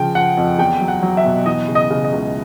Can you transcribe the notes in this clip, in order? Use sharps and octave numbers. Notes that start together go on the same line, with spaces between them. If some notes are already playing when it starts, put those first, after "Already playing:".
Already playing: C#3 F3 G5
F3 F#5
F2
E2 G5
F#3
F#5
F#3
E5
B2
E3 D#5
C#3
D#5
C#3
D#5
C#2